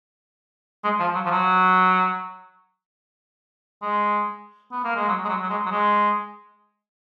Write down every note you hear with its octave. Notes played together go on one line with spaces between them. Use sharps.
G#3
F3
F#3
F3
F#3
G#3
B3
A#3
G#3
F#3
G#3
F#3
F#3
G#3
F#3
G#3